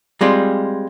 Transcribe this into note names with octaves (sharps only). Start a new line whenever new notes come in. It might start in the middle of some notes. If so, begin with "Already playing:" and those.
G3 G#3 C4 F4